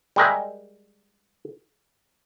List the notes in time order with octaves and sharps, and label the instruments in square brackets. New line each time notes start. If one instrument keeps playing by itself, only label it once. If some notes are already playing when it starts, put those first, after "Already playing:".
[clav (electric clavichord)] G3 G#3 A#4 E5